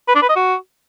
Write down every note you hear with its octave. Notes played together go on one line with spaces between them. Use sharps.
B4
D4
B4
D#5
F#4